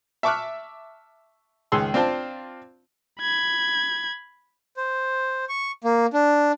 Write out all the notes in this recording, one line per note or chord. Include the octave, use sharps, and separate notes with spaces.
E5 A5 C#6 D6 F6 F#6
C#2 D#3 G#4 C6 E6
C4 D4 F4 C5 A5
B5 G#6
C5
C#6
A#3
D4